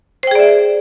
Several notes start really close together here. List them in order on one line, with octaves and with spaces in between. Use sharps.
C5 G5 G#4 D5 E5